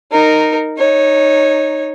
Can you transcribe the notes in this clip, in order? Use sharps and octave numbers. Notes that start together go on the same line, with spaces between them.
D#4 A#4
D#4 C#5